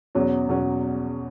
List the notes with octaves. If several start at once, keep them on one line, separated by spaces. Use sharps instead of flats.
E2 B2 F#3 C#4
E2 B2 F#3 C#4